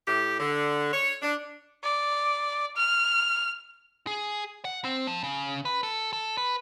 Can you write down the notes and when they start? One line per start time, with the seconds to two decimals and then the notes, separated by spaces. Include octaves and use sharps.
0.08 A2 G4
0.40 D3
0.94 C#5
1.22 D4
1.84 D5
2.77 F6
4.07 G#4
4.65 F#5
4.84 C4
5.07 F3
5.23 C#3
5.65 B4
5.83 A4
6.13 A4
6.38 B4